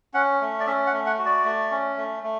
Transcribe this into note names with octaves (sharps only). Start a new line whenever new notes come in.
C#4 F#5
A3
D5
C#4 E5
F#5
A3
F#5
F#4
D5
A3
C#4
A3
A3